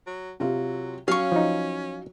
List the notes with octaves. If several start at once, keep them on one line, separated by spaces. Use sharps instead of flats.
F#3
C3 F#3 F4
F#3 C#4 F5 C#6
F3 D#4